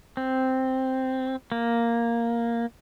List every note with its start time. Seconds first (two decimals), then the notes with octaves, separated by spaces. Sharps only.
0.17 C4
1.52 A#3